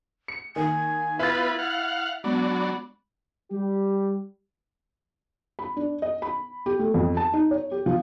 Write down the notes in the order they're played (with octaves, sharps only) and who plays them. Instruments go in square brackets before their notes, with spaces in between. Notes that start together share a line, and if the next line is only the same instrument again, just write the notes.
[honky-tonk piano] C#7
[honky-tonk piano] D#3 A#3 [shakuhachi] G#5
[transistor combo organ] B3 F4 B4 [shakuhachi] E4 [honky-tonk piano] E5 A6
[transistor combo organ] F5 F#5
[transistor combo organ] F#3 D4 [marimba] G#3 B3 [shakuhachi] B5
[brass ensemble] G3 G4
[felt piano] B5
D4
D#5
B5
G4
A3
F2
A5
D#4
C#5
G4
F3